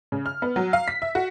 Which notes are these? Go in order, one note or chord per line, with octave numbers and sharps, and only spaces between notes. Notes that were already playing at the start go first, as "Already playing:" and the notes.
C#3
F6
B3
F#3
F5
B6
E5
F#4